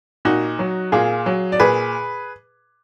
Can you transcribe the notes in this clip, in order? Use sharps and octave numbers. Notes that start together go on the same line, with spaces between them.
A#2 D#4 F#4
F#3
A#2 F4 G#4
F#3
D5
A#2 G#4 B4